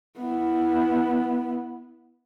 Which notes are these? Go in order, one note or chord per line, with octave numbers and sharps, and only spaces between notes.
B3 E4